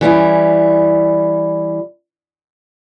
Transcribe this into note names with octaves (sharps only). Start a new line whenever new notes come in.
E3 G3 C#4 E4